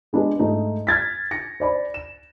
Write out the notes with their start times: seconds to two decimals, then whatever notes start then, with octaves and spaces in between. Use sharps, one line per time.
0.13 G#3 B3 D4 G#4
0.39 G#2 A3 D#4
0.87 F6 G#6 A6 B6
1.31 A#6 C#7
1.60 C5 D5 B5
1.94 E7